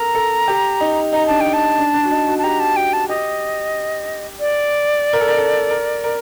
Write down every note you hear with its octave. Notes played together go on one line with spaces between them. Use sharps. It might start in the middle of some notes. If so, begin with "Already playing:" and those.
Already playing: A4 A#4 A#5
A4
G4
D#4
D#4 A#5
D4 A5
D#4 G5
A5
D4
D4
F#4
D#4
F#4
A5
G4 A#5
A5
F#4 G5
A5
G4 D#5
D5
A#4
A4
A#4
A4
A#4
A#4